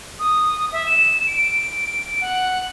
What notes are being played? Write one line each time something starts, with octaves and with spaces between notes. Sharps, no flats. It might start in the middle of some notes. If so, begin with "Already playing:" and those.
D#6
E5
E7
D7
F#5